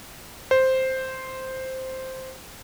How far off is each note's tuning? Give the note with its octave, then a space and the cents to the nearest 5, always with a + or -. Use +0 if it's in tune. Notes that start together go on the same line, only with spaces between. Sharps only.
C5 +0